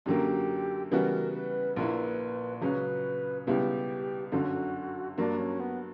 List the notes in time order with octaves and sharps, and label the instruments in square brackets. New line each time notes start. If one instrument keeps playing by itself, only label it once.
[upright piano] F#2 D3 F#3 A#3 [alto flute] G4
[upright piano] C#3 E3 G3 B3 F#4 [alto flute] A#4
[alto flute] B4
[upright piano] A#1 A#2 A#3 E4 [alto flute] B4
[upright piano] C#2 C#3 F#3 C#4 [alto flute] B4
[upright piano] C#2 B2 G3 B3 E4 [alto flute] G4
[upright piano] G1 F#2 D3 F#3 [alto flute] F#4
[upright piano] G2 F#3 A#3 [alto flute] D4
[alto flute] C#4
B3